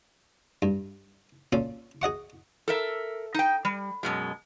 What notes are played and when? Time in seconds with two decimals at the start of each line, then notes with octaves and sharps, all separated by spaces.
0.62 G2
1.53 A#2 C#4 A4
2.02 G#4 D#5 F#5 C#6
2.68 A4 A#4 E5
3.34 D#4 G5
3.65 G3
4.03 F#2 B2 G#3